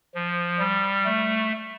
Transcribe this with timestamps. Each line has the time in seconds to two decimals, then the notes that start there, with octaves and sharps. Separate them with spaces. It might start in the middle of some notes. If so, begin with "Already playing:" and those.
0.15 F3
0.59 G3
1.05 A3